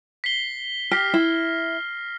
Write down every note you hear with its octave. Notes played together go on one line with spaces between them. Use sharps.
B6 C7 G7
G4 F6 A#6 C7
E4